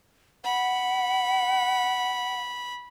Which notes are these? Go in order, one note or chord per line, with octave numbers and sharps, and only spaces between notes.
F#5 B5